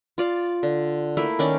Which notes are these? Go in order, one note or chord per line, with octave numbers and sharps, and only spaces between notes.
F4 D5 F5
D3
A3 A#3 E4
D#3 C#4 D5